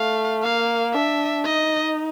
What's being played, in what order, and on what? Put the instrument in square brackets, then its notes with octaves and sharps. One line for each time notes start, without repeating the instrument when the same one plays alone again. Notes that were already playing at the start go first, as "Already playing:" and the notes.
Already playing: [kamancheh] A3 [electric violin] F5
[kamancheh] A#3 [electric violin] F5
[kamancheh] D4 [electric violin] E5
[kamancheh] D#4 [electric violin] D#5